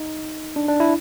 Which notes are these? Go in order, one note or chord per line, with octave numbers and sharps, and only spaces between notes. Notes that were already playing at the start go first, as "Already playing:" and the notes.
Already playing: D#4
D4
D4
E4